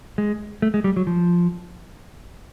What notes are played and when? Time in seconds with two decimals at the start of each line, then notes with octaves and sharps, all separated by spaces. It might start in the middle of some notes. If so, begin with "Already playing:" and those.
0.18 G#3
0.62 A3
0.74 G#3
0.84 G3
0.96 F#3
1.07 F3